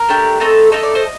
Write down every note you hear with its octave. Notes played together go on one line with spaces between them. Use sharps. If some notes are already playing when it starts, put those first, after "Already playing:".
Already playing: A#4
A3 D4 G4
A3 C4 D#4 A4
A3 C4 D#4 A4 D#5
D5
C5 D#5